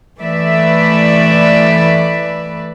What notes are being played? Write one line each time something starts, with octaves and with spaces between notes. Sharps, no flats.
E3 A3 B4 D5 E5